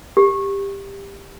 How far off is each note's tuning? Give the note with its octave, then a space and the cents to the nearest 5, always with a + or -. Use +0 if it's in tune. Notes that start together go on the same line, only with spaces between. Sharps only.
G4 +15